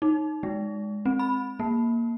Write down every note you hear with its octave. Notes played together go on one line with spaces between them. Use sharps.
D#4
G#3
C4
B5
A#3